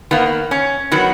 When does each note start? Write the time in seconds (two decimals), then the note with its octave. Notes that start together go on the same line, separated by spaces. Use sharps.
0.11 D#3 A#3 B3
0.51 C#4
0.92 D#3 F#3 B3